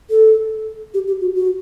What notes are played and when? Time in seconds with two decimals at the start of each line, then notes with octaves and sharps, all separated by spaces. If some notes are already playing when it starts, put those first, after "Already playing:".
0.10 A4
0.94 G4
1.07 G4
1.21 F#4
1.35 F#4